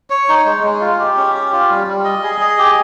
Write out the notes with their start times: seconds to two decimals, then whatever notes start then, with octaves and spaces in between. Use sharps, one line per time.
0.10 C#5
0.29 D#4
0.45 G#3
0.64 G#3
0.81 F4
0.99 G4
1.17 C#4
1.35 G4
1.52 F4
1.70 G3
1.87 G3
2.04 D#5
2.23 G#4
2.41 D#5
2.58 G4